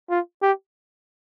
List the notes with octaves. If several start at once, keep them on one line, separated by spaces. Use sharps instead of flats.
F4
G4